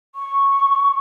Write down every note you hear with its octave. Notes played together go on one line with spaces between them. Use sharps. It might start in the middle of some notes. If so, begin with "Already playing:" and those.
C#6